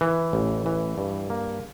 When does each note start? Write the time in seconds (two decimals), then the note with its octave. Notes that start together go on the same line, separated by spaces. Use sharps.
0.01 E3
0.33 A1
0.66 E3
0.98 G2
1.30 A#3